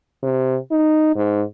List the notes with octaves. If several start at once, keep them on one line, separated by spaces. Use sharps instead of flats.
C3
D#4
G#2